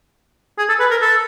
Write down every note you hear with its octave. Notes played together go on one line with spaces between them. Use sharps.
G#4
A4
B4
A#4
A4